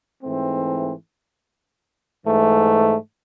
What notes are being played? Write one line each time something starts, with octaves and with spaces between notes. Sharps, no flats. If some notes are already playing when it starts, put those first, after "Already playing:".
G#2 E3 A3 C4
G#2 E3 A3